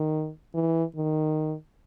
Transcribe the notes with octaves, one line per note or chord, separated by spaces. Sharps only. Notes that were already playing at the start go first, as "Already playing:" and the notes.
Already playing: D#3
E3
D#3